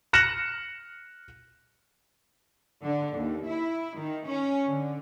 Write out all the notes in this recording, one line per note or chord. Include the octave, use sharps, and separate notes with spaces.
F6 F#6 A#6 C#7 E7 F#7
D3
D#2
E4
D#3
C#4
D3